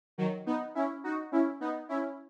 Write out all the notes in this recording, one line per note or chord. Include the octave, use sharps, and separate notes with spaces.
D#3 F#3
B3 D#4
C#4 E4
D#4 F#4
C#4 E4
B3 D#4
C#4 E4